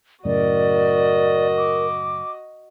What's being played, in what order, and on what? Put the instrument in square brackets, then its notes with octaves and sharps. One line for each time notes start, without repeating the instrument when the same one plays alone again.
[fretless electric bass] F#2 A2 C#3 [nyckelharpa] F#4 D#5 [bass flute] A#4 [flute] D5
[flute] D6